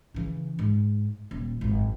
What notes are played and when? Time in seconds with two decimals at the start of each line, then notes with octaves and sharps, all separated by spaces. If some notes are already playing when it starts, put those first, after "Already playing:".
0.14 C#3 E3
0.59 G#2
1.31 D#1
1.61 G#1 F#2